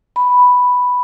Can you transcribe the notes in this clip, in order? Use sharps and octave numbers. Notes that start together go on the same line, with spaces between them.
B5